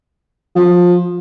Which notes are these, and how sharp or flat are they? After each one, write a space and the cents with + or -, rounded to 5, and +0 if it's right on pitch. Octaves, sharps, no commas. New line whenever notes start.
F3 +20